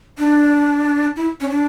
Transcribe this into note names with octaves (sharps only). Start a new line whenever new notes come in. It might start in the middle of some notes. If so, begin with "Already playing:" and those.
D4
E4
C#4
D4